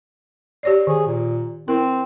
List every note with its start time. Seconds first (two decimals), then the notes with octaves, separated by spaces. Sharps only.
0.63 G4 C#5 D5
0.87 D#3 G#4
1.06 A#2
1.68 C4 E4 A#4